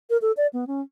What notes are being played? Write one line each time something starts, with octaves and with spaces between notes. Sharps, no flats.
A#4
A4
D5
B3
C#4